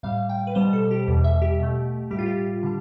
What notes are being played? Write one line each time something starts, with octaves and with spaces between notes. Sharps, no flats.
A2 G3 F5
G5
B4
B2 G3 C5
A4
G4
E2 B2 G3
E5
G4
B2 A3
A2 G3 G4
F4
G4
D3 G3